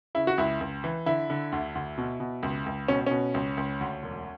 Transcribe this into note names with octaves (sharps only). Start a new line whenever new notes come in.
C#3 E4
F#4
C#2 E4
C#2
E3
D3 E4
D3
D2
D2
B2
B2
C#2
C#2
B2 C#4
B2 C#4
C#2
C#2
D2
E1